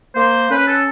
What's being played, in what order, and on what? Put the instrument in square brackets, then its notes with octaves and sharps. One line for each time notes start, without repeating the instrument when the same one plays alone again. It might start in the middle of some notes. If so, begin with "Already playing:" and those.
[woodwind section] A#3 C5
C#4 B4
A4